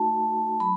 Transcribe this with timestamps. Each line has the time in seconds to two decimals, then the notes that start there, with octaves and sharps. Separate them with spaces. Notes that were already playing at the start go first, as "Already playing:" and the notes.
Already playing: A3 D#4 F#4 A5
0.60 F#3 B5